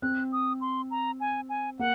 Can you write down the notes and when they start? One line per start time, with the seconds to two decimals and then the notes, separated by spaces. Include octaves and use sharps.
0.02 C4 F#6
0.32 D#6
0.61 C6
0.91 A#5
1.20 G#5
1.49 G#5
1.79 A#3 F#5